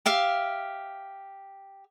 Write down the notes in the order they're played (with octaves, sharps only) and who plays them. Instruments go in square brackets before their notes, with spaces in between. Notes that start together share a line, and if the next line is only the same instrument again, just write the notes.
[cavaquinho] G4 E5 F5